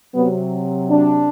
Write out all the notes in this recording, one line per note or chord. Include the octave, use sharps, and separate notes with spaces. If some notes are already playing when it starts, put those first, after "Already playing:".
C3 F#3 B3
D4